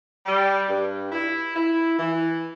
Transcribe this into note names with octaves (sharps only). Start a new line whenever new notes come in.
G3
G2
E4
E4
E3